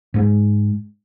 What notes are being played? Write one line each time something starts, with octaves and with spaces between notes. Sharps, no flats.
G#2 G#3